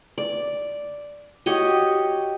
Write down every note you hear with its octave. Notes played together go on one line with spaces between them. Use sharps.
D5
F#4 G4 C#5 D#5